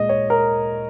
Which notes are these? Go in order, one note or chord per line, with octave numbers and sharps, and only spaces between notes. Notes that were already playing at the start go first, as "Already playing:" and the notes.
Already playing: A#2 G#3 D#5
C#5
A#4